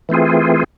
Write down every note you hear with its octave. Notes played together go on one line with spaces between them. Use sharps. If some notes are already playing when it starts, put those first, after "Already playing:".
E3 A3 C4 F4 G#4